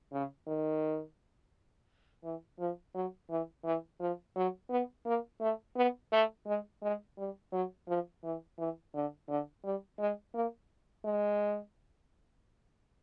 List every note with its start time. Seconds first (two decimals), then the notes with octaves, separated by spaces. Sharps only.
0.13 C#3
0.47 D#3
2.24 E3
2.59 F3
2.95 F#3
3.30 E3
3.65 E3
4.00 F3
4.36 F#3
4.70 B3
5.06 A#3
5.41 A3
5.76 B3
6.12 A3
6.47 G#3
6.83 G#3
7.18 G3
7.52 F#3
7.88 F3
8.24 E3
8.58 E3
8.94 D3
9.29 D3
9.64 G3
9.99 G#3
10.34 A#3
11.05 G#3